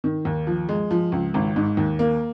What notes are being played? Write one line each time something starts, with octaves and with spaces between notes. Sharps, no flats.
D#3
D#2
F3
G#3
F3
C#2
G#1
G#2
D#2
A#3